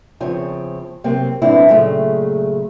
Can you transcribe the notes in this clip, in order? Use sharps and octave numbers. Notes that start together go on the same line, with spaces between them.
E2 C#3 F3 C4 C#5
C3 F#3 A#3 C4
F#2 A2 E3 C4 D4 E4
A#2 C#3 F#3 G#3 A3